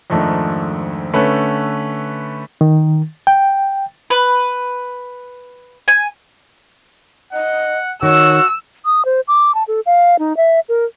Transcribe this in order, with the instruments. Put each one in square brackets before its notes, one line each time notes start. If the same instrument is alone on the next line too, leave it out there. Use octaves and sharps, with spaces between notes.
[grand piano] F2 G#2 D#3 A3 D4
D3 A3 C#4 B4
[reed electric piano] D#3
G5
[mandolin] B4
G#5
[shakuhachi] D#5 [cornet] F#5
[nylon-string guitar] D#3 [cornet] F#4 [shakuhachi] C#5 [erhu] E6
[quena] D#6
C5
D6
A5
A4
F5
D#4
E5
A#4